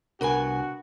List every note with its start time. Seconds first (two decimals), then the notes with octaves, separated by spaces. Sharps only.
0.21 C2 B3 D4 F#4 A#4 G#5 B5